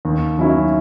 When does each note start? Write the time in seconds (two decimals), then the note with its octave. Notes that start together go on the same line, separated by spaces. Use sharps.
0.05 D#2
0.38 D#3 F#3 C#4 E4